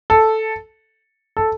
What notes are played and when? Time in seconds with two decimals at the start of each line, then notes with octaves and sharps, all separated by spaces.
0.10 A4
1.37 A4